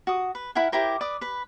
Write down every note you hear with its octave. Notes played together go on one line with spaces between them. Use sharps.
F#4 D#6
B4
E4 A#4 F#5 G#5
E4 G4 A#4 C5
B4 D5 D6 D#6
B4 B5